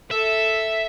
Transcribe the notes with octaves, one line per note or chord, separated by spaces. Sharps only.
A4 E5